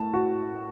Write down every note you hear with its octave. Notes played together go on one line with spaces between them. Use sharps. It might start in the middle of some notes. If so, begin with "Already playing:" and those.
Already playing: A2 A5
F#4